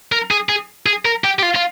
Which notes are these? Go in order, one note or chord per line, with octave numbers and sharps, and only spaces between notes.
A#4
G#4
G#4
G#4
A#4
G4
G4
F4
F4